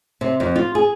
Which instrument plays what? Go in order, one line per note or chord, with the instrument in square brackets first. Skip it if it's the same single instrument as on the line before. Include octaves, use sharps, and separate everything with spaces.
[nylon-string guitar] C3
F2
F4
G#4